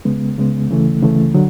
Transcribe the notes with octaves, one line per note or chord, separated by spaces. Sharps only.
C#2 C#3 G#3 B3
C#2 C#3 G#3 B3
D2 C#3 E3 A3
D2 C#3 E3 A3
D3 F#3